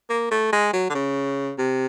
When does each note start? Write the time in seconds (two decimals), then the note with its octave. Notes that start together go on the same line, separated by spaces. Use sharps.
0.10 A#3
0.31 A3
0.53 G#3
0.73 F#3
0.90 D3
0.95 C#3
1.58 C3